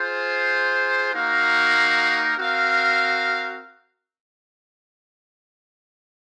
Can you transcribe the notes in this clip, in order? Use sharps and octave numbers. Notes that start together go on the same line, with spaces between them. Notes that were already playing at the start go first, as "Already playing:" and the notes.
Already playing: F4 G#4 C5
A#3 D#4 F#4 A#4 F5
C4 F#4 A#4 F5